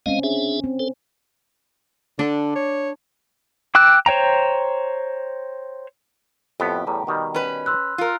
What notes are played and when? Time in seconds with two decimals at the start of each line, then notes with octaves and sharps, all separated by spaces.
0.06 G#3 C4 C#4 D#5 F5
0.23 D4 G#4 E5
0.64 C4
0.80 A4 C5
2.19 D3 D4
2.55 C#5
3.75 G5 D6 E6 F#6
4.06 C5 C#5 G5 A#5
6.60 F2 A2 B3 G4
6.87 E2 A2 G3 A#5
7.07 B2 D#3 G3
7.34 C#4 B4
7.66 C6 E6 F#6
7.98 F4 A#4